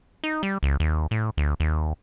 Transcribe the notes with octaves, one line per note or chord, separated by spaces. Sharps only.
D#4
G3
C#2
D#2
A2
D2
D#2